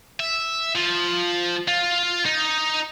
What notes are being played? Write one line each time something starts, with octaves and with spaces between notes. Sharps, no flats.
E5
F3
F4
D#4